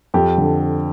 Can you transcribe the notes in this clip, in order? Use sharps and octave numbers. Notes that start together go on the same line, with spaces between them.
F2 G4
D3